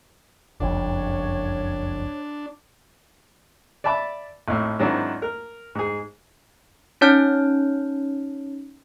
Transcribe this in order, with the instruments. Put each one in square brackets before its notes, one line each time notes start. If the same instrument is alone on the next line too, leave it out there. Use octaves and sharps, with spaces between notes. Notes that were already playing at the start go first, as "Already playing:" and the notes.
[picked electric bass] F#1 C2 F2 [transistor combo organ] D4 [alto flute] C#5
[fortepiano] D5 E5 A5 B5 D6
G#1 A2
G#2 D#3 F#3 C4 D4 E4
A#4
G#2 G#4
[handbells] C#4 D#4 C#5 A5 F6 G6